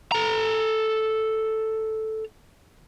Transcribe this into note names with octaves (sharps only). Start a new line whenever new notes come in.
A4 A#5